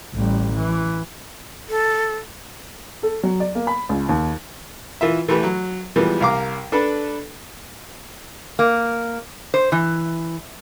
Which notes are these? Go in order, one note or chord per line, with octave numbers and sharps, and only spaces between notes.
A1 G3
E3
A4
A4
F#3
D5
A#3
B5
C#2
D#2
E3 F4 E5
E3 A3 G4 B4
F#3
E3 F3 G3 G#3 B3
C2 A#4 F5 A#5 D6
D4 A4 B4
A#3
C5
E3